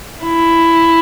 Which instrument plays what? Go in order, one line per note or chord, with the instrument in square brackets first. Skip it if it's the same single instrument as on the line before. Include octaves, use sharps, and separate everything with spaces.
[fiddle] E4